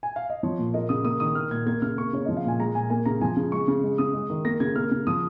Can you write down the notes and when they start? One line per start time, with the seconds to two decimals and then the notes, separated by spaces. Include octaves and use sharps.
0.03 G#5
0.16 F5
0.30 D#5
0.43 F3 C#5
0.59 A#2
0.74 A#3 D#5
0.89 C#3 D#6
1.05 A#3 D#6
1.20 D#3 D#6
1.35 A#3 F6
1.51 A#2 G#6
1.66 A#3 G#6
1.82 C#3 F6
1.98 A#3 C#6
2.13 C#3 C#5
2.26 F3 D#5
2.37 F5
2.44 A#2 G#5
2.59 G#3 A#5
2.75 A#2 G#5
2.90 A#3 G#5
3.05 C#3 A#5
3.21 F3 G#5
3.37 C#3
3.52 G#3 C#6
3.68 C#3
3.83 G#3
3.98 C#3 D#6
4.14 G#3
4.30 D#3
4.45 A#3 A#6
4.60 C#3 G#6
4.76 A#3 F6
4.91 C#3
5.07 F3 D#6